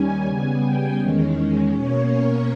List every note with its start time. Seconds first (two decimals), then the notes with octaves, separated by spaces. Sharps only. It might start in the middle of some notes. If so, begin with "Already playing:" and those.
Already playing: D#2 D#3 G3 C#4 G#5
0.26 C#3 G3 B3 G#5
0.62 G5
0.98 E2 D#3 G#3 C#4
1.72 B2 A#3 C#4 C#5
2.09 A#4